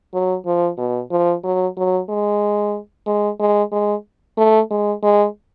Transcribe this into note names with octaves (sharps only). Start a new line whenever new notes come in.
F#3
F3
B2
F3
F#3
F#3
G#3
G#3
G#3
G#3
A3
G#3
G#3